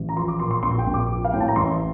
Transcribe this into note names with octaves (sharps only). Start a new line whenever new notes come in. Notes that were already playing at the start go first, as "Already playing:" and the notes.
Already playing: A1
A#5
F3 C6
D6
A#2 C6
C6
A#1 C6
G5
A#1
D6
F3
F5
A2 G5
A5
A#5
A1 C6